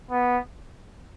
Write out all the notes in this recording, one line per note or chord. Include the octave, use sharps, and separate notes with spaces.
B3